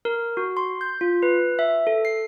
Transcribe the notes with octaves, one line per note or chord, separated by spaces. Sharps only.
A#4
F#4
C6
G6
F4
B4
E5
A4
C7